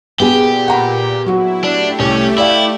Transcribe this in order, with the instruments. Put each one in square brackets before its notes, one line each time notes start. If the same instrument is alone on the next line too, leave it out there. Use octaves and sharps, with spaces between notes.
[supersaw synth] A#2 [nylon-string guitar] B3 G#4 [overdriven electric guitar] G4
[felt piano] F#5 A#5 B5
[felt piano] F#3 F#4 [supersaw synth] E4
[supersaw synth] A3 G4 [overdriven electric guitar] D4
[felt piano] C2 [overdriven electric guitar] C#4
[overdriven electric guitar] E4 [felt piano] D5 F5